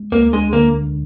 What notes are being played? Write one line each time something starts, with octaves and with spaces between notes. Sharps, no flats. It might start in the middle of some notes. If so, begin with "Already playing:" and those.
Already playing: G#3
D2 A#3
G#3 D4
D3 A#3